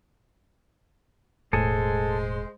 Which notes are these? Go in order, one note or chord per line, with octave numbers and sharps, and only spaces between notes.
E1 A2 G#3 G#4 A4 C5